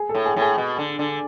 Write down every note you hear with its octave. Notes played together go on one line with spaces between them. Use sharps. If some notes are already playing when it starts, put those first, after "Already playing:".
Already playing: G#4
A4
A2
G#4
A2
G#4
B2
D3
D3